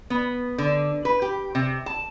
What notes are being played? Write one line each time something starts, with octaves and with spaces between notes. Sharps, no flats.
B3
D3
B4
G4
C3
A5